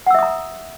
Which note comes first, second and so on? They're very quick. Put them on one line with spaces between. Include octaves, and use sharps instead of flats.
F#5 E6 E5 D#6 A#5